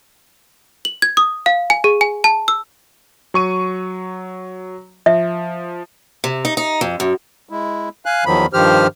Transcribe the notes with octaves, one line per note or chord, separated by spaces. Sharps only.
F#7
G#6
D#6
F5
G#5
G#4
G#5
A5
E6
F#3 C#6 D#7
F3 E5
C3
D#4
D#4
F2
F#2
G#3 E4
F5 G#5 F#6
E2 D#3 F3 F#3 B5
G2 D#3 F3 G4 C5 F6